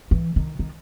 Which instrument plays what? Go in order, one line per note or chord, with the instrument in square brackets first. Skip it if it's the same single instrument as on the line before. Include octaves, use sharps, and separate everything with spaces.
[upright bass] E3
D#3
D#3